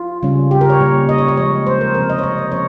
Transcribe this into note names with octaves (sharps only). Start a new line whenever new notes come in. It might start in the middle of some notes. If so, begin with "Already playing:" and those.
Already playing: F4
C#3 G3 C#4
G4
A#4
C#5
A#2 G3 C#4
D#5
C#5
D#5
F3 G#3 C#4 C#5
C5
A#4
C3 F3 C4 A#4
D#5
C#5
D#5
C#5
F3 C#4 C#5